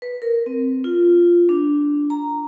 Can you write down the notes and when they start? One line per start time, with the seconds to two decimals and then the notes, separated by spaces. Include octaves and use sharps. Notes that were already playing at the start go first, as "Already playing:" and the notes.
0.02 B4
0.22 A#4
0.46 C4
0.84 F4
1.49 D4
2.10 A#5